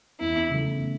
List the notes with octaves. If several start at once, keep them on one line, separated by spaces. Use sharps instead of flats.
E2 E4
C#3 A3